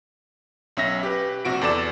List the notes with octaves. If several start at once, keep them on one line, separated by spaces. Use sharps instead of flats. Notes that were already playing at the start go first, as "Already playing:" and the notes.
B1 C#4 E5 A#6
G4 B4
A#1 C3 F#4 D7
E2 A4 D5 E7